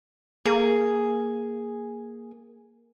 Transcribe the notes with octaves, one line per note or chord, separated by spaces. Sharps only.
A#3 G#4